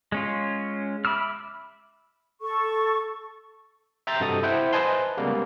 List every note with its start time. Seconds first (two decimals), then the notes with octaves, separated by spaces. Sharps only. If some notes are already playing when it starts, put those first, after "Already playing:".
0.12 G#3 C#4 F4
1.05 E5 B5 D6 E6 F6
2.41 A4 C#6
4.07 E5 G5 A#5 C6 G6 A6
4.20 G2 C3 F#4 A4 D#5 D#6
4.43 E4 C5 E5 F#5 G5
4.73 B4 C5 D#5 G#5 A5 C6
5.17 C#3 G3 G#3 A#3 B3